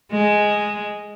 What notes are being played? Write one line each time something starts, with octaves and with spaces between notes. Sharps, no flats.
G#3